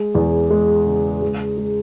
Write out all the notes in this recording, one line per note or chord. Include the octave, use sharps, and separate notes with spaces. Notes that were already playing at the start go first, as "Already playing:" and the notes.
Already playing: G#3
E2
G#3
C#3
G#3
G#3